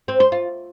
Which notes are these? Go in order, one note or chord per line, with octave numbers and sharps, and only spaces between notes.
C4
C5
F4